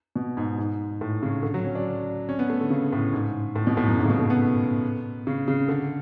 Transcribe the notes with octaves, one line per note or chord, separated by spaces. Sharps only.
B2
G#2
G#2
A2
C#3
D3
F#3
C#4
D4
C#4
B3
A3
D3
C#3
A2
G#2
A2
B2
A2
F#2
G#2
C#3
B2
A3
B3
C#3
C#3
D3